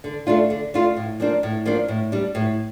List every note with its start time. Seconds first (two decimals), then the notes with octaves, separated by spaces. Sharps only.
0.04 D3
0.27 A3 D4 F4
0.50 D3
0.74 A3 D4 F4
0.96 A2
1.20 F3 A#3 D4
1.43 A2
1.65 F3 A#3 D4
1.88 A2
2.12 G3 D4
2.35 A2